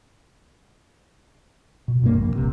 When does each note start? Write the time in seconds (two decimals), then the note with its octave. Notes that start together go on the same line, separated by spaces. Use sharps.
1.88 B2
2.02 D#1 G2 C3 A#3
2.17 B1 F2
2.36 D#1 C3